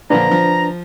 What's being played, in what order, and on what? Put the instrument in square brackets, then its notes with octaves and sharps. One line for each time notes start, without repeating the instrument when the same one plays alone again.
[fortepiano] A#2 D3 F3 [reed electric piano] D4 B4 [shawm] A#5
[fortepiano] F3